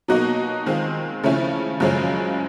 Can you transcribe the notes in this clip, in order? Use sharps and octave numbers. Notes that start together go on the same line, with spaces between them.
B2 F#3 A#3 D#4 F#4
D#3 G#3 C4 F4
C#3 F3 A3 C#4 E4
F#2 C#3 F3 G#3 C#4